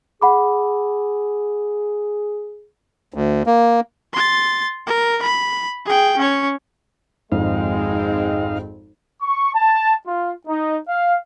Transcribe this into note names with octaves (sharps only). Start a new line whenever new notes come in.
G#4 F#5 B5 D6
D2
A#3
C6 A6
A#4
B5
G#4 G5
C#4 C#5
G#1 F2 G#2 G#3 C4 D#4 F5
C#6
A5
F4
D#4
F5